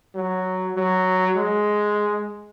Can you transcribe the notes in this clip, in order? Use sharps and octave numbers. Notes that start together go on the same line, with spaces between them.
F#3
F#3
G#3